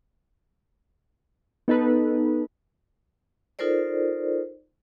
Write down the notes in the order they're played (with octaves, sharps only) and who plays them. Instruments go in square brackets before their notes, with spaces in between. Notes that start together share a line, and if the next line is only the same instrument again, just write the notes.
[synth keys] B3 D#4 A4 B4
[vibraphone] D#4 F4 A4 A#4 C5 D5